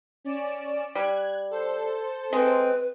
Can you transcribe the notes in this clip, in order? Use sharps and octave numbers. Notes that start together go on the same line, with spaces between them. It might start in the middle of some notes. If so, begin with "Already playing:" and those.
C#4 D5 E7
G3 F#6 G#6
A4 C5
G#3 C4 B4